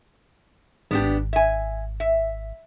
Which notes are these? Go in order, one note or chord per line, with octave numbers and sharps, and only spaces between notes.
G#1 B3 D4 G4
E5 G#5
E5